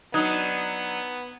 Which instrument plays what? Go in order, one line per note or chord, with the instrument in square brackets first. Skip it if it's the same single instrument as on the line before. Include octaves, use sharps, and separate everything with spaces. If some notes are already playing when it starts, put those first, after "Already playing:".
[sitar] F#3 D4 [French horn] B3 [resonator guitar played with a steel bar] D#4 [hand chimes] F#6 G#6